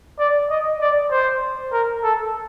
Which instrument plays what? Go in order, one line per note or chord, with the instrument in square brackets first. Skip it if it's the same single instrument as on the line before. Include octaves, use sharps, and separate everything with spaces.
[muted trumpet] D5
D#5
D5
C5
A#4
A4